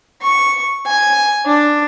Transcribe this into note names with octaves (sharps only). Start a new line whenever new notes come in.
C#6
G#5
D4